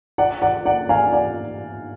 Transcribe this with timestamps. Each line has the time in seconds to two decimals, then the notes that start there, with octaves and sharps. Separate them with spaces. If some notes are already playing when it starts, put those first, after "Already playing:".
0.18 D5 F#5
0.42 D5 F#5
0.65 D5 F#5
0.89 F5 G#5
1.13 D5 F#5